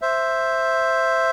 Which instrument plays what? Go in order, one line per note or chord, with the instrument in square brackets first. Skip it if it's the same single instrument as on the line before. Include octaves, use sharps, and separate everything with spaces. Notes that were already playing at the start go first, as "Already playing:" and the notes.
[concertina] C5 E5